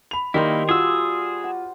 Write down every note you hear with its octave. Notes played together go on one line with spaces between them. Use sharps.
B5 F7
D#3 G3 A#3 D#4 E4 C5 C6
F4 F#4 G#4 E6
F#5